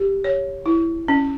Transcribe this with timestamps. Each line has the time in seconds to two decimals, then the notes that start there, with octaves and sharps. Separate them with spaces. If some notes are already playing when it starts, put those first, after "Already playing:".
Already playing: G4
0.24 C#5
0.66 E4
1.08 C#4